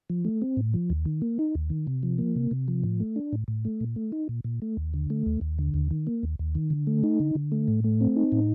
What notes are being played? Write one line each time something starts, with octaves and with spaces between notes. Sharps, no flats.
F3
A3
C4
A2
F3
D#2
D#3
A#3
D#4
D#2
D#3
C3
F3
A#3
C3
C3
F3
A2
A3
D4
A2
A2
A3
A#2
A3
D#4
A#2
A#2
A3
D#2
D3
A3
D#2
D#2
D3
D#2
D#3
A#3
D#2
D#2
D#3
D3
A3
D#4
D3
D3
A3
A2
A3
C4
D#4
A2